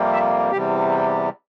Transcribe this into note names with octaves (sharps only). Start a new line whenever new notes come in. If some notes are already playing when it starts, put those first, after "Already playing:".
Already playing: F2 C3 G3 A#3
E5
E2 C3 G3 G4